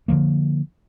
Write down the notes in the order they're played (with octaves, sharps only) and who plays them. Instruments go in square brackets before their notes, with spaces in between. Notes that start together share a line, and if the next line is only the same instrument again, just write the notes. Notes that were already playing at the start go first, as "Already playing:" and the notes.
[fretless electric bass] D3 D#3 F3 A#3